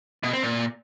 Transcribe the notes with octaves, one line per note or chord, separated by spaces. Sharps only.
B2
C4
A#2